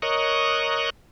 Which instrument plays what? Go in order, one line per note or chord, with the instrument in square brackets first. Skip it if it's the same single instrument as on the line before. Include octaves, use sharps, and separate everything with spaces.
[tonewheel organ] A#4 C#5 D#5 C#6 D#6 F#6